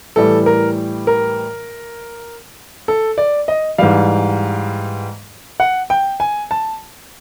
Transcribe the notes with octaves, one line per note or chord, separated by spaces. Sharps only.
A2 E3 G3 A4
A#4
A#4
A4
D5
D#5
G#2 E3 G3 F5
F#5
G5
G#5
A5